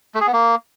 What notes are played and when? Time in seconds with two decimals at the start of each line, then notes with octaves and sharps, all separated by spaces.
0.15 A3
0.21 G#4
0.27 B3
0.33 A#3